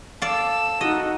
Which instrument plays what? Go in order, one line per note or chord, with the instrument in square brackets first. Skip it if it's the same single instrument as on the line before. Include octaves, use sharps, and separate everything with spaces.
[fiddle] A4 E6 [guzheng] D5 F5
[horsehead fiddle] D#4 F#4 [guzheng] D#5